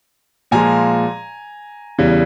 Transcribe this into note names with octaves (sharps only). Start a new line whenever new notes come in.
A#2 F3 G#3 G#5 A#5
E2 C#3 E3 G3